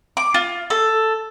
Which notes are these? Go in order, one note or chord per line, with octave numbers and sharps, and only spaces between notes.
D6
F4
A4